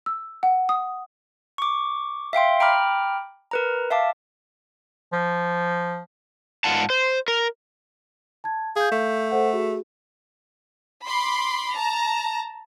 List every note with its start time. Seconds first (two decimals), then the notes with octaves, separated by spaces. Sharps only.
0.06 E6
0.43 F#5
0.69 D#6
1.58 C#6 D6
2.33 E5 F5 G5 C6
2.60 G5 A#5 B5 D6 F6
3.51 A#4 B4 A#5
3.91 E5 F5 A5 D6
5.12 F3
6.64 G#2 F4 F#5 A5
6.90 C5
7.28 A#4
8.44 A5 G#6
8.76 G#4 F5 G6
8.92 A3
9.31 A4 C5 F#5
9.53 F#4 G#4
11.05 B5 C6 D6
11.74 A5 A#5